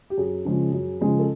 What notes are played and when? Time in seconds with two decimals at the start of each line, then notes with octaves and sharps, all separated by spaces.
0.10 G4
0.17 F#2 G#4
0.45 C#3 F3 G#3 C#4
0.72 F#2
1.01 C#3 F3 G#3 C#4
1.19 A4